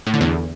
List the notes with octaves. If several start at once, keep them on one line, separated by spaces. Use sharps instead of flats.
A2
D3
E2